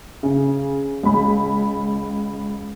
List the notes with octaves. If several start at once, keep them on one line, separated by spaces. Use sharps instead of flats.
C#3
C#2 B5